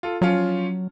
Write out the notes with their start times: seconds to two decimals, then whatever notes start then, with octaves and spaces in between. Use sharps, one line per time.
0.03 F4 A4
0.22 F3 F#3 C#4 F4